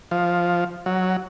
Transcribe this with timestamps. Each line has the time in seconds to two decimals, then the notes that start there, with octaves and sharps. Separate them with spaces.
0.11 F3
0.86 F#3